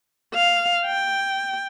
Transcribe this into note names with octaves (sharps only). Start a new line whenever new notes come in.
F5
G5